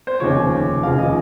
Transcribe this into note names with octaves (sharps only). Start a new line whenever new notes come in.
C5
F1 D#2 C#3 F3 C#5
F1 D#2 C#3 F3 F5
D#5